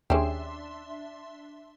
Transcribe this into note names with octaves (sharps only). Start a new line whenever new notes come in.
D#2 C#4 D4 G4 G#4 E5 C6